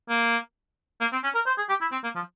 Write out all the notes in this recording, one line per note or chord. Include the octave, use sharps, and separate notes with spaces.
A#3
A#3
C4
C#4
A#4
C5
G#4
G4
E4
C4
A#3
F3